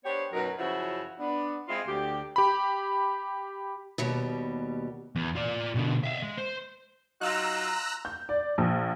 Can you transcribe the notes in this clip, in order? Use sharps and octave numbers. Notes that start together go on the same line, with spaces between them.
B3 D4 G4 C5 C#5
F#2 B2 F#3 D#4 A#4 B4
F#2 C#3 F3 C#4 E4 F#4
B3 D4
G#3 C4 E4 F4 D#5
D2 G4
G4 B5
D#2 B2 G3
E2
F4 D5
B2 D3
E5 F5
G#3
C5
F#3 D#4 F4 A#5 E6 F#6
G6
D5
A#1